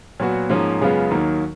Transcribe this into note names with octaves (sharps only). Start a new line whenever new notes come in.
A#2 F#3 B3 F#4
G#2 F3 A#3 C#4
F#2 C#3 G#3 B3 F4
D#2 D#3 F#3 A#3 D#4